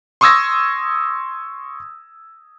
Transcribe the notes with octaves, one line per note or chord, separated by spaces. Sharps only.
C6 C#6 D#6 E6 G#6 A#6